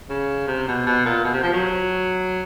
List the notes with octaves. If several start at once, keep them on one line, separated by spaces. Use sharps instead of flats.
C#3
C3
B2
B2
A#2
B2
C3
F3
F#3